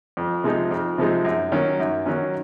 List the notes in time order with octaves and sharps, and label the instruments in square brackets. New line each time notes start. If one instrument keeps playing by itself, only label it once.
[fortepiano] F2
C3 F3 G#3 D#4
F2
C3 F3 G#3 D#4
F#2
D#3 F#3 C#4
F#2
D#3 F#3 C#4